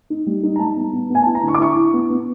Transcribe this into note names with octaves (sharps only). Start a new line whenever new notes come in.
D#4
G3
D#4
A#5
G3 A5
B3
B3
B3 G#5
A5
E4
A#5
D3 C#6
D6
E4 C#6
E4
B3
B3